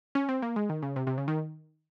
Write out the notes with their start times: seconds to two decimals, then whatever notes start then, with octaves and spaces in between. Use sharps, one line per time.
0.15 C#4
0.29 C4
0.42 A#3
0.56 G#3
0.69 D#3
0.82 C#3
0.96 C3
1.07 C3
1.18 C#3
1.28 D#3